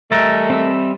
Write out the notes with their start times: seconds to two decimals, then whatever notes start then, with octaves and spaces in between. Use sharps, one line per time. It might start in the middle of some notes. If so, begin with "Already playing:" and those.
0.12 G3 A3 A4 A#4 D#5
0.50 C4 E5 E6